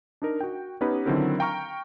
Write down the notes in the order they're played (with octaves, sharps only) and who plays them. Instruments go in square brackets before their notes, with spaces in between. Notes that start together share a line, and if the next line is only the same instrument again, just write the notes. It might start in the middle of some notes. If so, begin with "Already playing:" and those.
[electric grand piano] D4 D#4 A#4
F#4 G5
B3 C#4 D#4 G4 B4
D3 D#3 F#3 C4 E4 A#4
F5 G5 A#5 C#6 F6